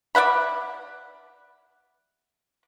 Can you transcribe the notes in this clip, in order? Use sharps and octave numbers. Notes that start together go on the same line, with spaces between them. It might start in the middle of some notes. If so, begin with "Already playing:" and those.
D5 E5 F#5 B5